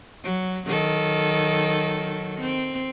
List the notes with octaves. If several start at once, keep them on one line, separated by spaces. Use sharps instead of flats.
F#3
D#3 F#3 A4
C4